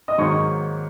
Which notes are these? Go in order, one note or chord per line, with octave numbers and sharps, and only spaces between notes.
D#5 D#6
G#2 D#3 F#3 A#3 C#5 C#6